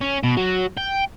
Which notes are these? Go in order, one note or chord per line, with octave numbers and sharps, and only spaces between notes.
C#4
B2
F#3
G5